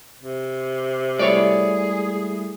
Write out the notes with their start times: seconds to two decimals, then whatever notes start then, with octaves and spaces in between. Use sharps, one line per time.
0.19 C3
1.19 G3 A3 E4 G#4 C#5 D5